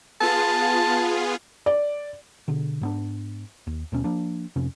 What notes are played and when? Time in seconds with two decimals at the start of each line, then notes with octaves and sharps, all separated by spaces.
0.21 B3 F4 G#4 A5
1.66 D5
2.48 B2 D3
2.81 G#2 B3 D4
3.67 D#2
3.92 D#2 B2 C#4
4.04 F3 A#3 D4
4.56 F2 C3 C#4